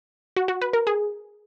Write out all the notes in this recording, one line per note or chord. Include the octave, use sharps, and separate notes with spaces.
F#4
F#4
B4
A#4
G#4